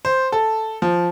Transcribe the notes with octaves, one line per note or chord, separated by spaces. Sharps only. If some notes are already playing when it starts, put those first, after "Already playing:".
C5
A4
F3